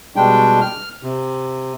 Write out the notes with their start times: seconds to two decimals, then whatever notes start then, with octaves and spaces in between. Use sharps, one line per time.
0.16 B2 G3 G#3 D4 G5
0.61 F6
1.03 C3